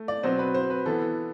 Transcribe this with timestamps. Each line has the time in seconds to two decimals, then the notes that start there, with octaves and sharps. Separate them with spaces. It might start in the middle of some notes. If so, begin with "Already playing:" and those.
Already playing: A3
0.08 D5
0.23 B2 F#3 C4 C5
0.39 B4
0.54 C5
0.70 B4
0.86 E3 B3 A4